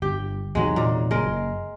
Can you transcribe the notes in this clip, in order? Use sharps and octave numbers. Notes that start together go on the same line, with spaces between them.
G1 G4
E2 C3 D#3 F#3 G#3
A#2
F#1 G#3 A#4